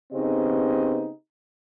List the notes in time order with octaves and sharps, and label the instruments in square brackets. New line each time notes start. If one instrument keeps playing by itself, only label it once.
[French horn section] C#3 B3 C4 D#4 G4 D#5